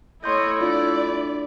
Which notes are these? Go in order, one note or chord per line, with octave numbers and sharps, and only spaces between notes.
A3 E4 C#5 D#5 C6 G6
D4 F4 D5
D4